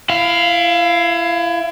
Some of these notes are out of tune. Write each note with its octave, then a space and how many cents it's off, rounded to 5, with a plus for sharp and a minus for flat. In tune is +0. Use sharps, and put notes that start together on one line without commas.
E4 +30 F5 +0